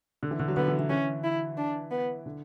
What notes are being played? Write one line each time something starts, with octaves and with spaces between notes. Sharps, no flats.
D3
E3
D3
F#3
D3 B3
E3
E3
E3 C#4
E4
D4
B3
D3